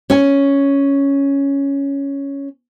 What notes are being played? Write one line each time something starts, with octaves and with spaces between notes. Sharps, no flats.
C#4 C#5 G#5